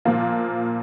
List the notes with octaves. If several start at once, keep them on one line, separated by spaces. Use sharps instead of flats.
A#2 F3 A#3 F4